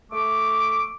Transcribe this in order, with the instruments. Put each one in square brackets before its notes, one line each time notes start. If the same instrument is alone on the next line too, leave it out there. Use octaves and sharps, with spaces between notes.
[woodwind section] A3 D6